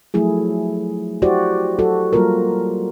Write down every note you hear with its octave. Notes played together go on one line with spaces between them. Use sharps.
F3 F#3 A3 E4 G#4
E4 F#4 G4 C5 D5
F#3 F#4 A4
F#3 G3 A#3 F4 A#4